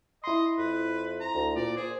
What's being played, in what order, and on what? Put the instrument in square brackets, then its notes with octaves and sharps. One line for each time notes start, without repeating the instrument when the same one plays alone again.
[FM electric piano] E4 C6 [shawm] D#5
[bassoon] F2 [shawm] B4
[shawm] A#5
[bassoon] D2
[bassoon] A#2 [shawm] D5
[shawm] G#4 [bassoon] C5